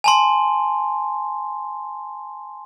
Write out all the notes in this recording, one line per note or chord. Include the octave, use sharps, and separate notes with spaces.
G#5 A5 C6